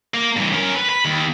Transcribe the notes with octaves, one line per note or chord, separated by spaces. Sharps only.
A#3
G2 E3
C#4 A#4
B4
B5
D#2